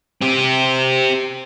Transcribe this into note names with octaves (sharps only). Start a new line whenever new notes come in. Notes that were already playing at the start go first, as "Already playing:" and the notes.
C4 G4